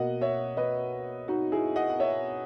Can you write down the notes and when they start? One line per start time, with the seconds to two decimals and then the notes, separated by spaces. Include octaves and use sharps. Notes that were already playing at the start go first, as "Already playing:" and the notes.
Already playing: B2 A#3 D#5 F#5
0.21 C#5 E5
0.57 B4 D#5
1.28 D#4 F#4
1.52 E4 G#4
1.76 D#5 F#5
1.90 F#5
2.00 C#5 E5